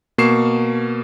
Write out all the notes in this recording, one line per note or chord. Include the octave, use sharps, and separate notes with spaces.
B2 A#3 C#6 C7 E7